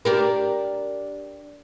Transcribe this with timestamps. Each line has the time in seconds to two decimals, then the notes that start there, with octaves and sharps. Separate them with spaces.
0.05 D4 G4 A#4